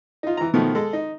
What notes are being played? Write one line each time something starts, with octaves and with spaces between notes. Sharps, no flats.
D#4 F4
E3 A#5
B2 D#3 F3 A3
G#3 A4
D#4